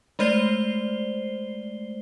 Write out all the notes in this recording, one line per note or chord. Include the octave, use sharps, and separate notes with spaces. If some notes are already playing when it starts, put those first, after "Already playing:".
G#3 A3 C5 D5 C7 G7